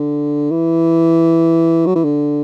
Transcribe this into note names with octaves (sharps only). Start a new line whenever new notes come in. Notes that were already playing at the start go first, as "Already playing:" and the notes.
Already playing: D3
E3
F#3
E3
D3